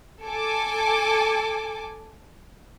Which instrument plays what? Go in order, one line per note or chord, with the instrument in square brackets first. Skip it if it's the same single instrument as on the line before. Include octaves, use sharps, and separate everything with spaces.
[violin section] A4 G#5 D6